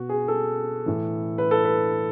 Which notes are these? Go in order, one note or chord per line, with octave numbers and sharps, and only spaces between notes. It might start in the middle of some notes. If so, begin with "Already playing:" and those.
Already playing: B2 F#4
G#4
A4
A2 E3
B4
A4
B4